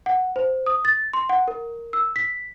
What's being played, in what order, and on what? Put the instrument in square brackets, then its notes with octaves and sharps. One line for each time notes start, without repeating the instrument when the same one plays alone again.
[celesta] F#5
C5
D#6
A6
C6
F#5
A#4
E6
B6